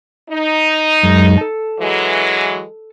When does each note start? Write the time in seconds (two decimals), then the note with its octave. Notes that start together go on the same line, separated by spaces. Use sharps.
0.30 D#4
1.03 F#2 G#3
1.38 A4 A5
1.80 E3 F#3 G#3